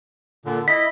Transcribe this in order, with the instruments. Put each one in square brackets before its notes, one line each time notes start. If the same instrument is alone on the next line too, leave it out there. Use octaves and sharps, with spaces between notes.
[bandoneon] A#2 D3
[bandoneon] E4 D#5 [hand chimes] B6